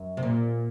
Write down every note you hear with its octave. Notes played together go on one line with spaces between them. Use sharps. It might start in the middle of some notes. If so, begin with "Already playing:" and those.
Already playing: F#2
C3
A#2